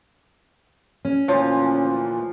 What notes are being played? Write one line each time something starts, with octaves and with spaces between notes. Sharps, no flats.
C#4
D2 A#2 E3 F3 C#5